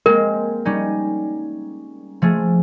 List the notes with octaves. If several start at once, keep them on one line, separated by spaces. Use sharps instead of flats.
G#3 A#3 C4 A#4
G3 C#4 D#4
F3 A3 G#4